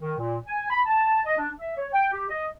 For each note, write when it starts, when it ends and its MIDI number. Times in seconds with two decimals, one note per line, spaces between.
0.01 0.14 51
0.19 0.38 46
0.47 0.67 80
0.70 0.80 83
0.86 1.20 81
1.26 1.36 75
1.37 1.51 62
1.59 1.75 76
1.77 1.87 73
1.94 2.05 79
2.11 2.29 67
2.30 2.48 75